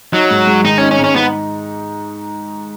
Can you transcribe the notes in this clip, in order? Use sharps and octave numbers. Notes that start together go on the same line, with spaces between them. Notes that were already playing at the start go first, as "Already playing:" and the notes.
F#3 D#4
G#2
G#3
D#3 D#4
C#4 D#4
C#4
G#2
C#4
B3 D#4